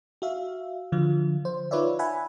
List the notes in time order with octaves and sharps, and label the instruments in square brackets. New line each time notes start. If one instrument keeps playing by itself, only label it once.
[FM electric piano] F#4 E5 F5
D3 F3 F4
C5
D#4 F4 B4 C#5 D5 E5
E5 F#5 G#5 B5